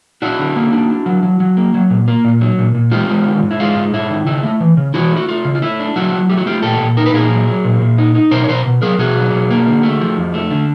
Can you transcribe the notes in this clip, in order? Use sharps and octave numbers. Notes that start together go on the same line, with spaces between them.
D4 E4 F#4
D3
A#3
D4
D4
F#3
F#3
F#3
A#3
F#3
A#2
A#3
A#2
F#3
A#2
A#2
G#3 F4 G4
G#3
D#3
G#2
E4
G#3 F4
G#2
G#2 E4
D#3
C#3 E4
A3
E3
C#3
E3 E4 F#4
A3
F#4
A3 F4
C#3
F4
A3 E4
D4
F#3 E4 F#4
F#3
A3 G4
F#4
A3 F4 G4
A#2 G4 A4
A#2
D#4 A#4
B4
A#2 G#4 A#4
F#3
F#3
A#2
A#2
D#4
D#4
B2 A#4 C5
C#5
B2 A#4 C5
B2
F#3 G#4 A#4
B2 F#4 G#4
F#3
B2
A#3
D3
A3
F3
F2
A3
D3